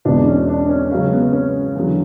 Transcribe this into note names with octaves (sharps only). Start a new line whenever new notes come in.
E1 E2 B2 D4
C#4
D4
C#4
C#2 C#3 F#3 C#4
B3
C#4
E2 D3 F#3